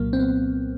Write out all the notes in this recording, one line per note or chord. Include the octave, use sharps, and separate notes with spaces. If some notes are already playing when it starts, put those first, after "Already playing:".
Already playing: C2 A#2 F#3 A#3
C4
B3